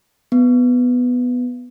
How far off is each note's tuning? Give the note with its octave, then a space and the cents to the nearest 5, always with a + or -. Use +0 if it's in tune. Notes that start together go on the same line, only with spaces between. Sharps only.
B3 +5